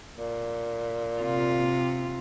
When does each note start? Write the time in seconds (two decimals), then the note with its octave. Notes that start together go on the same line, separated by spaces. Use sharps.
0.17 A#2
1.22 C3 F4